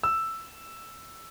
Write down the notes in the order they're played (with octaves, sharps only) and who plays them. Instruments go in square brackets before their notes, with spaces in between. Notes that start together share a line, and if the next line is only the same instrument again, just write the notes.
[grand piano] E6